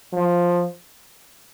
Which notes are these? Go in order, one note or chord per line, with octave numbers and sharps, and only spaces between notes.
F3